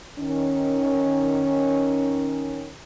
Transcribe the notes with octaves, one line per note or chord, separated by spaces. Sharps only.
D#3 C#4